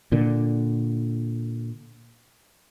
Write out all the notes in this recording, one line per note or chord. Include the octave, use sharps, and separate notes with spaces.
A#2 D3